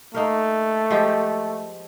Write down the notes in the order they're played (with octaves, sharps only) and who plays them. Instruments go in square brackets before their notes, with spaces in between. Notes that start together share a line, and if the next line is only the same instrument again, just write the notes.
[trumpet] A3 [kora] A#3 D#4 A#4
[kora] F3 G#3 G4